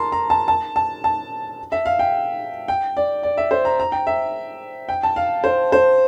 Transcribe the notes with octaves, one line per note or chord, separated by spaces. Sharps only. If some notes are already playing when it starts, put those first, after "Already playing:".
Already playing: A#4 A5 A#5 C6
A#5
A5
A5
A5
A5
E5
F5
G5
G5
D5
D5
E5
C5
A#5
A#5
G5
E5
G5
A5
F5
C5
C5